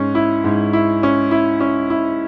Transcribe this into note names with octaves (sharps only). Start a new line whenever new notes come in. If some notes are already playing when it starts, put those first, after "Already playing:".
Already playing: G#2 C#4
E4
G#2
E4
C#4
E4
C#4
E4